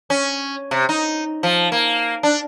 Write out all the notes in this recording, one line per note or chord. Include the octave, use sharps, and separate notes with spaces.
C#4
C3
D#4
F3
A#3
D4